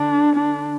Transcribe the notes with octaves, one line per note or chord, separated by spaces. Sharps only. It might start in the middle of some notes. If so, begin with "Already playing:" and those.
Already playing: D3 D4
D4